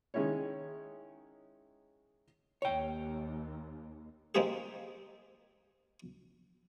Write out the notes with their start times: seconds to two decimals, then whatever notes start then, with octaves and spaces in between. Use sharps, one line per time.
0.14 D#3 G#3 C#4 E4 C#5
2.62 D#2 C#5 G5
4.35 G#3 A#3 C4 F4 G4 G#4